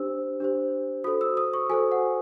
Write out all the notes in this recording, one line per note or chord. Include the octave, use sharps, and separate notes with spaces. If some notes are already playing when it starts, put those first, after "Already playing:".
Already playing: D4 G4 C5 E6
D4 G4 C5
F#4 A4 C5 D#6
E6
D#6
C#6
F#4 A4 C5 G#5
F#5